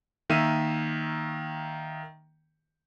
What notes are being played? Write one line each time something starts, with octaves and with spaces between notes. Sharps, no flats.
D#3 A#3 E5 D#7